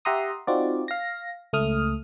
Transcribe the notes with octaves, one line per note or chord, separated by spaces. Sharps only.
G4 E5 F#5 A#5 C6 D#6
C4 D#4 F4 F#4 D5
F5 A#6
C#2 A3 D#6 F6